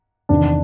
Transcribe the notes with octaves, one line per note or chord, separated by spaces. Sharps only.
E2 C3 D#3 D4